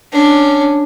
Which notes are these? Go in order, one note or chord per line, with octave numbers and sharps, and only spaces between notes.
C#4 D4